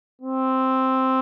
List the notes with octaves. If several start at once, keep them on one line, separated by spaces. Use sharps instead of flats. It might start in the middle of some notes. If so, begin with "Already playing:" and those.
C4